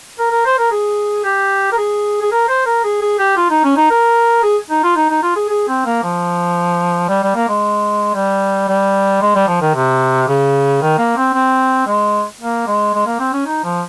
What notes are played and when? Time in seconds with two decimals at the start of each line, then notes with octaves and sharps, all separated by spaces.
0.19 A#4
0.31 A#4
0.46 C5
0.59 A#4
0.71 G#4
1.24 G4
1.72 A#4
1.78 G#4
2.22 G#4
2.32 A#4
2.48 C5
2.66 A#4
2.84 G#4
3.02 G#4
3.19 G4
3.37 F4
3.50 D#4
3.64 C#4
3.77 D#4
3.90 A#4
4.43 G#4
4.70 D#4
4.84 F4
4.96 D#4
5.09 D#4
5.23 F4
5.36 G#4
5.49 G#4
5.68 C4
5.85 A#3
6.03 F3
7.08 G3
7.23 G3
7.35 A#3
7.49 G#3
8.15 G3
8.68 G3
9.21 G#3
9.35 G3
9.47 F3
9.61 D#3
9.75 C3
10.28 C#3
10.81 D#3
10.98 A#3
11.17 C4
11.34 C4
11.86 G#3
12.41 A#3
12.67 G#3
12.94 G#3
13.06 A#3
13.20 C4
13.33 C#4
13.46 D#4
13.64 F3